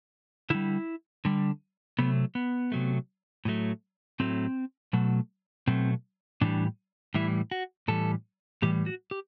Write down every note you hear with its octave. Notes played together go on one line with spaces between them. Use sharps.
D3 G3 E4
D3 G3
C3 F#3 A3 B3
B3
C3 F#3 A3
A2 F#3 A3
A2 F#3 A3 C4
B2 F#3 A3
B2 F#3 A3 C4
A2 E3 G3 D4
A2 E3 G3 E4
F#4
A2 E3 G3 A4
A2 E3 G3 G4
F#4
G4